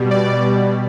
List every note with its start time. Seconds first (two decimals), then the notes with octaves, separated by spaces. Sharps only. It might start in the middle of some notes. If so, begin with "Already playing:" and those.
Already playing: B2 G3
0.11 D5